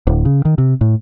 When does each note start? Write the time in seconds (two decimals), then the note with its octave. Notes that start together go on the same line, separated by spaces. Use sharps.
0.07 D1
0.25 C#3
0.45 D#3
0.58 C3
0.81 A2